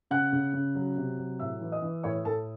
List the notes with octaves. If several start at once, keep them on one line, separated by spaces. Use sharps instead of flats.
C#3 F#5 F#6
C#3
C#3
F#3
C3
F#3
A2 E5 E6
E3
D#5 D#6
E3
A2 C#5 C#6
A2 A4 A5